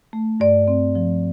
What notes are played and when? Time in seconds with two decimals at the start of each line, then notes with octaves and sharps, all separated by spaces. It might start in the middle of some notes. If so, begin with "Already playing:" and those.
0.13 A3
0.40 G2 D5
0.68 C4
0.95 F3